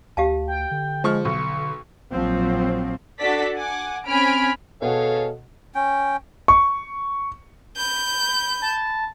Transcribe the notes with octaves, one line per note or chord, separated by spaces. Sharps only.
D2 G4 F5 A5
G5
D3
F3 G#3 C#6 F6
B1 C#6
A#1 F3 F#3 C4
D4 F#4 A4 D5 B6
F#5 G#5 D6
C4 C#4 G#5 B5 F6 D7
B2 G#4 A4 C#5 F5 F#5
C#4 G5
C#6
B5 G6
A5